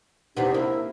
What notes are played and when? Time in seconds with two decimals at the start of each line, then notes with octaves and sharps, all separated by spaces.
0.37 E2 C3 B3 D4 D#4 G4
0.54 A#3 E4